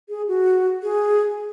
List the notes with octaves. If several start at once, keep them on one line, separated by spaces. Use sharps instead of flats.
G#4
F#4
G#4